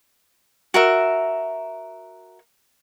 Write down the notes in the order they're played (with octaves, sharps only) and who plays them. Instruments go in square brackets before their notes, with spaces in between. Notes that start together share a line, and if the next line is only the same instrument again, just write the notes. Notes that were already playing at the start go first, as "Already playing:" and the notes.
[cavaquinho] F#4 A#4 E5